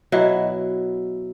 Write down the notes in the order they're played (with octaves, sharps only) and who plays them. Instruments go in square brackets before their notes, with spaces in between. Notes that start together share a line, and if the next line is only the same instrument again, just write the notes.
[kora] B2 F#3 E4